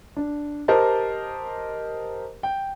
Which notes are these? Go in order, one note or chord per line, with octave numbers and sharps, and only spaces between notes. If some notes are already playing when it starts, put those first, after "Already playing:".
D4
G4 A#4 C5 D#5 A5
G5